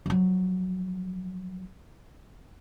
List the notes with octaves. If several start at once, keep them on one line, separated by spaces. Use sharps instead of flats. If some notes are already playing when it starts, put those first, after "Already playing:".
F3 F#3